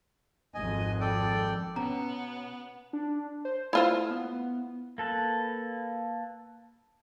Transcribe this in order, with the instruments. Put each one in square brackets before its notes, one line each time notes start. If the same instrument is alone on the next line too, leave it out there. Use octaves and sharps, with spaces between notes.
[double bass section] G#1 F2 [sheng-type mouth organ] D#5 G#5
[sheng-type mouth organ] A4 D5 G5
[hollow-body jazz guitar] B2 [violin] B3 [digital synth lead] C#4 [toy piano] A#5
[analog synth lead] D4
C5
[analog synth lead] A3 [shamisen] E4 F4 C5
[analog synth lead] B3
[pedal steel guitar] A#3 A4 B4